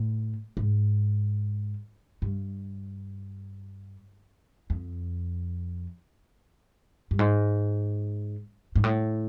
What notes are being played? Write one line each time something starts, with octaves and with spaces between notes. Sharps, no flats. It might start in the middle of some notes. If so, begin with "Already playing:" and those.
Already playing: A2
G#2
G2
F2
G2
G#2
G#2
A2